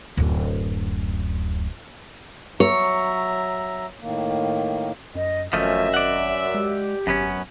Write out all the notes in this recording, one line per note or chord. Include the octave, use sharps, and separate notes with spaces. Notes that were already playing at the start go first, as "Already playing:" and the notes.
D1 F#2
F#3 C#5 E5 A#5
A2 D#3 A#3
F#2 D#5
G#1 F#2 F3 A3 C#4 D#5 E5
D5 F#5
G#3 G4
G#1 F#2 B3 C#4